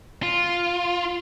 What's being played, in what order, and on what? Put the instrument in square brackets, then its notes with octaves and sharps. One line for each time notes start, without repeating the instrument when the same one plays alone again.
[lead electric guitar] F4